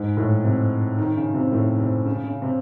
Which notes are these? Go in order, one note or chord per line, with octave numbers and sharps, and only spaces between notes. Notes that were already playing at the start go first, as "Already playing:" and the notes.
Already playing: G#2
A2
C3
D#3
C#3
C3
A2
C3
C#3
C#3
C3